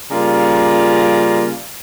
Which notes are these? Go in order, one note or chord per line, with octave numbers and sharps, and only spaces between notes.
C#3 G3 A#3 F4 D5 A#5